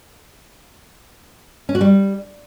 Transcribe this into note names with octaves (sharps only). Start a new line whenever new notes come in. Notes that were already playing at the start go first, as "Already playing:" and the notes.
C#4
F#4
G3